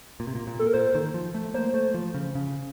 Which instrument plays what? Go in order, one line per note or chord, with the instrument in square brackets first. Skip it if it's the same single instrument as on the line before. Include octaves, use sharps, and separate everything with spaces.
[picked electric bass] A#2
C3
A#2
A#2
[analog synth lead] A4
A#4
[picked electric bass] A#2 [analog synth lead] C5
[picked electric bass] D#3
F3
A3
[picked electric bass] A#3 [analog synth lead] C5
[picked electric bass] A3
F3
C#3
C#3